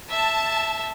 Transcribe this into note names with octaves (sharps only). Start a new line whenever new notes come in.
E5 A5